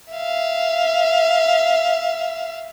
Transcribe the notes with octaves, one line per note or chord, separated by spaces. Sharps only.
E5 F5